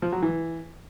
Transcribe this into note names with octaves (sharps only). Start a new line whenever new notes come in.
F3
F#3
E3